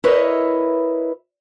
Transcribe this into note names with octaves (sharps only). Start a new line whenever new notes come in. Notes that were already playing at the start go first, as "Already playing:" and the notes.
E4 A#4 B4 C#5 D#5 E5